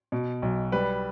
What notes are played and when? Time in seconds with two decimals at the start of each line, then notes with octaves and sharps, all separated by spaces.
0.12 B2
0.42 B1
0.72 G3 B4